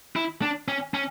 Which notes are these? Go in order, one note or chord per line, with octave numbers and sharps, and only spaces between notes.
E4
D4
C#4
C#4